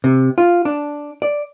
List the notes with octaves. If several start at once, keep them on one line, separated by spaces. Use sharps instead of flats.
C3
F4
D4
D5